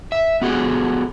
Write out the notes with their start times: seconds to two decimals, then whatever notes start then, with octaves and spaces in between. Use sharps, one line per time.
0.12 E5
0.42 B3 F#4 G#4 A4